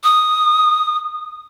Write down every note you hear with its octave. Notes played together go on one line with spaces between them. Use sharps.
D#6